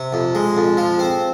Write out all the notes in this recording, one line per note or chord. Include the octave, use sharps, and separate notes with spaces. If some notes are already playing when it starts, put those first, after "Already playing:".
Already playing: C3
F2
G#3
F2
F3
C4